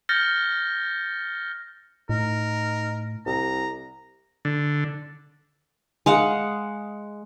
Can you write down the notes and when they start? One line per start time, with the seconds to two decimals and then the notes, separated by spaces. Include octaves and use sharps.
0.09 F6 G6 A6 A#6 C#7 G7
2.09 A2 D#4 A#4
3.26 C2 A#5
4.45 D3
6.06 G#3 F5 F#5